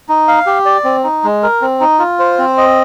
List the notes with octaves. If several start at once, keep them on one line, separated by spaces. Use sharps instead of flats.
D#4
F5
G4
D5
C4
D#4
G#3
A#4
C4
D#4
F4
C5
C4
D#5